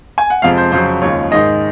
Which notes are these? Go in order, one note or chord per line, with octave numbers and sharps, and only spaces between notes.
G#5
F#5
F2 C3 F3 G#3 F5
C5
F2 C#3 F#3 C5
D#2 C#3 F3 G#3 C#5
G#2 D#3 G#3 D#5